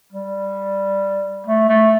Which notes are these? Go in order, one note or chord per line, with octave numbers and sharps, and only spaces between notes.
G3
A3
A3